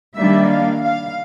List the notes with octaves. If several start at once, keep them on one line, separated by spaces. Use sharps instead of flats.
D#3 G3 A#3 D4 E5
F5
F5